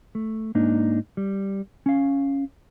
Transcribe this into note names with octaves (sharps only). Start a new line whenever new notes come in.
A3
G#2 A#3 D4 D#4
G3
C#4 F5